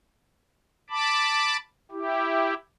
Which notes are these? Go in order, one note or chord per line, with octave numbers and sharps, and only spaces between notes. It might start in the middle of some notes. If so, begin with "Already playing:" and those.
A5 B5 D6
E4 G4